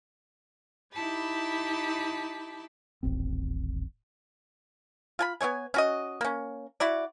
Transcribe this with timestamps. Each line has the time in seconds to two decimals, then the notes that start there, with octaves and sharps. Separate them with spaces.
0.93 D#4 E4 G4 A5 B5
3.03 D#1 A1 C4
5.19 F4 G#5 B5
5.41 B3 C#4 C#5 G#5
5.74 C#4 F#4 D#5
6.21 A#3 C#4
6.80 E4 F#4 D5